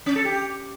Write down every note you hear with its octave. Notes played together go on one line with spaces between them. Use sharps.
C#4
A4
G4